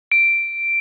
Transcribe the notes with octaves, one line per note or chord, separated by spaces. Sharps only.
D7